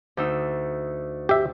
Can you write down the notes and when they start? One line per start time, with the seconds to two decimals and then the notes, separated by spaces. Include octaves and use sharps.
0.17 D2 D#4 E6
1.29 G4 E5